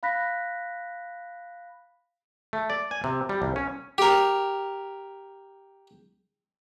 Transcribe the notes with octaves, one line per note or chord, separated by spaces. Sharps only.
F5 B5 F#6 A#6 B6
A3
D5
G#5
C3
G3
C2
C#4
G4 A#4